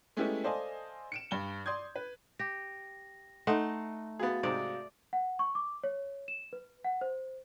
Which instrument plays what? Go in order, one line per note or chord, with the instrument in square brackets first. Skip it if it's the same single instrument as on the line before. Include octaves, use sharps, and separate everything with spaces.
[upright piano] G#3 A3 B3 C#4 E4 G4
A4 C5 D5 D#5 F5 G#5
C#7 D7 E7
G2 G7
D5 C6 D#6 G6 G#6
B4
[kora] G4 [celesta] A#6
[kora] A3 D#4 [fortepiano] D#5 F#5 C6
[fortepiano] B3 G#4 [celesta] F#4 F5 A6
[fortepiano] G#2 C3 [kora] D5
[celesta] F#5
C#6
D6
C#5
E7
B4
F#5
C5